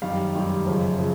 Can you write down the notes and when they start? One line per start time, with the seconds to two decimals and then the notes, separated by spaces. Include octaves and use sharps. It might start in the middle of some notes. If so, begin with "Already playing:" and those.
0.02 F#2 D#3 G3 F5
0.34 F#2 D#3 G3
0.66 F#2 C#3 F3
0.98 C#3 F3